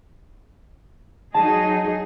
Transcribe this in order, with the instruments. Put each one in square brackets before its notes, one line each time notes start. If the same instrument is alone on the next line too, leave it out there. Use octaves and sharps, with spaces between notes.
[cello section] F#3 D#4 G#4 [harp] A5 A#6